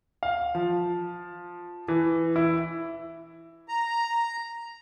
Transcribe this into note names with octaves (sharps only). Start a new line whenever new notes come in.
F5
F3
E3
E4
A#5